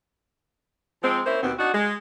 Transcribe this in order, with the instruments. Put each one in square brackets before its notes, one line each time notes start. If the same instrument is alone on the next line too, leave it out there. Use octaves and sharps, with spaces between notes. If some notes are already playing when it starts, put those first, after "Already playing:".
[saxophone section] F3 G#3 C4
A#3 C#4 E4 C5
D#2 B2 B3 C4
D4 D#4 F#4
G#3